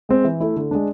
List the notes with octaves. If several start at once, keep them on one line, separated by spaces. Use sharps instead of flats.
G#3 C4
E3
A3 E4
D3
G#3 D4